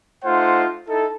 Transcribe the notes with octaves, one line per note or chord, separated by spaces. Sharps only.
A3 D#4 F4 C5 F#5
D#4 E4 A4